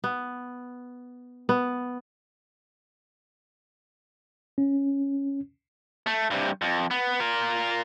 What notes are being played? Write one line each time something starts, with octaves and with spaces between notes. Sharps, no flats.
B3
B3
C#4
A3
G2 C3
F2
B3
F4 A#4